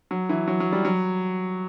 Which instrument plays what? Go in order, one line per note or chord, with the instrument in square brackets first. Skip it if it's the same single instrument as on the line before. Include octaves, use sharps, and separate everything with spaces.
[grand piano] F#3
E3
F#3
F#3
G3
F#3